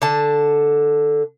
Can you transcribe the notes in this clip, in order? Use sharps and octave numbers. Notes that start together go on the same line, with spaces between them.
D3 A5